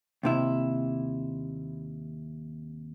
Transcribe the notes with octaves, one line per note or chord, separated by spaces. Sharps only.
D#2 C3 E4